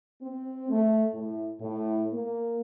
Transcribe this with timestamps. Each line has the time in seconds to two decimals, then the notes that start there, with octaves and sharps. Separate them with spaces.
0.21 C4
0.70 A3
1.13 A2
1.60 A2
2.12 A#3